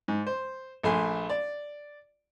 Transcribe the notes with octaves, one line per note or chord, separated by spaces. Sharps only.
G#2
C5
A#1 A3 G#5 C6
D5